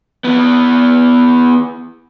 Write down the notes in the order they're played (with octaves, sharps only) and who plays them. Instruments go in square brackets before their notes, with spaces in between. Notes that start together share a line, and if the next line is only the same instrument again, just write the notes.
[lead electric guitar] E3 B3